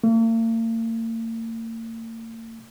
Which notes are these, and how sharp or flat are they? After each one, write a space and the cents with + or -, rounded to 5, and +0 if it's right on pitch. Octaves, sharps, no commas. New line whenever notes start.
A#3 -45